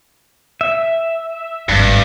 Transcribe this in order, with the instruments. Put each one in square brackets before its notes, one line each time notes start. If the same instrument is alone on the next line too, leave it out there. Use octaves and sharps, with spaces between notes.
[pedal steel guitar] E5
[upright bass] G#1 D#3 [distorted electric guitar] G2